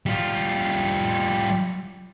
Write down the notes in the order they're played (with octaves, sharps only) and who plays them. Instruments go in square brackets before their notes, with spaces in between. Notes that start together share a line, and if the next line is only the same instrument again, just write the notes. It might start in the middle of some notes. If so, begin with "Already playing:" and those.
[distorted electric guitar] G3 F4